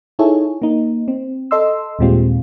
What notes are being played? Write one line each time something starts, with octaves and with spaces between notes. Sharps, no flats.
D#4 E4 G#4 A4 C#5
A#3 D#4
C4
A4 D#5 C6 E6
D#2 A#2 G3 G#3 C4 F4